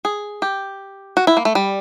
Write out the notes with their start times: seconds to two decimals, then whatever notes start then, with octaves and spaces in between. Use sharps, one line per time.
0.05 G#4
0.42 G4
1.17 F#4
1.27 E4
1.37 A#3
1.45 A3
1.55 G3